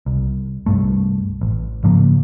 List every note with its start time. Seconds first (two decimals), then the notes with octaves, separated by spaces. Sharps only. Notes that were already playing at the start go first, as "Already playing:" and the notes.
0.06 C2
0.66 C2 G2 A3
1.41 A1
1.84 G#2 C#3 F3 A#3